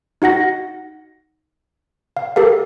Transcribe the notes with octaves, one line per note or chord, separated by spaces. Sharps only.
D#4 F#4 F#5 A#6
F5
G4 A4 A#4 F5